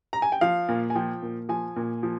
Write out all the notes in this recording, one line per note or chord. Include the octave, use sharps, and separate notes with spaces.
A#5
G#5
G5
F3 F5
A#2
G#5
F3 G5
A#2
F3 G#5
A#2
F3